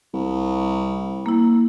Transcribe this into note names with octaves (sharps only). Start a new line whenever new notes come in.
C2
A#3 E4